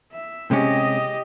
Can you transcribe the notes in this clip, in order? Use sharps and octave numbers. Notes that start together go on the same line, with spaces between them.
E5
C3 G#3 C#4 G4 D#5